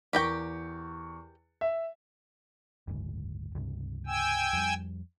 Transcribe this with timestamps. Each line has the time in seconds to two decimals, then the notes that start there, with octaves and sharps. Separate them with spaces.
0.13 E2 G4 A#4 G5 C#6
1.61 E5
2.88 F#1 D2 G#2
3.55 C#2 G2 C3
4.07 G5 G#5 E6
4.53 F2 G3